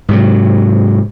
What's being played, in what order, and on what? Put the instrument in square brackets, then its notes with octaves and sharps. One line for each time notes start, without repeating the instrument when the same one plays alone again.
[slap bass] G#2 C3 F#3